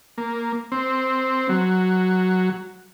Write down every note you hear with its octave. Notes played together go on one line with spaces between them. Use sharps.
A#3
C4
F#3